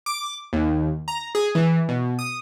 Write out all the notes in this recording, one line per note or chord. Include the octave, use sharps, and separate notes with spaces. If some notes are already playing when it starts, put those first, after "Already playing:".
D6
D#2
A#5
G#4
E3
B2
D#6